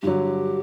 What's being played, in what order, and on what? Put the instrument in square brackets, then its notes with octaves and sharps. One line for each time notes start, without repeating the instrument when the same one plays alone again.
[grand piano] G2 D3 F#3 [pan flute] G4